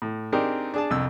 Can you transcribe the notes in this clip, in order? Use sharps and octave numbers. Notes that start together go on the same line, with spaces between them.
A2
C4 D4 D#4 G4 G#4 A#4
D4 G#4 A5
C2 F2 E6